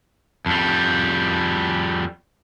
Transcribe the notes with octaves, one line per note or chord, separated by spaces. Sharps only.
F2 G3